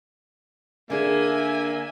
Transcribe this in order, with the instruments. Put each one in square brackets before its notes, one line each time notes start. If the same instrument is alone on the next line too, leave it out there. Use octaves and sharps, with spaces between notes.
[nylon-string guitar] D3 D4 G#4 [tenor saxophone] A#3 [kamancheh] E5 G#5